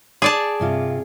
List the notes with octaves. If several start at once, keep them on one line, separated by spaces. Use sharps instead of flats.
G#4 D5 A5
G2 C3 F4